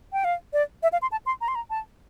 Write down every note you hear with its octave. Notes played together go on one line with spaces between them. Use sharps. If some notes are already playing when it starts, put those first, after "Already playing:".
G5
F5
D5
E5
F5
C6
A5
C6
A#5
C6
A#5
A5